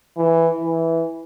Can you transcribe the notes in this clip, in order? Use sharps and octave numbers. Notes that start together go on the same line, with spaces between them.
E3
E3